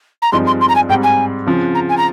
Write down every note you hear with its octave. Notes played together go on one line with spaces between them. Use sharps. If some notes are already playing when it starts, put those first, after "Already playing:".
A#5
G2 F3 G#3 C4 D#4 C6
C6
C6
A#5
G#5
G#2 G3 C4 G5
G#5
C#3 F3 C4 F4
A#5
G#5
A#5